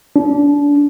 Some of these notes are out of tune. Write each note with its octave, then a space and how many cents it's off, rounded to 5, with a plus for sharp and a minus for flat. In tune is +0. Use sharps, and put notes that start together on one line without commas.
D4 -30